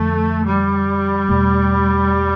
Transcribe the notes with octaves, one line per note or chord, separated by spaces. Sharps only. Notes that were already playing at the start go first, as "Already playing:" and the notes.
Already playing: F2 D3 F3 A3
G3
E2 B2 A3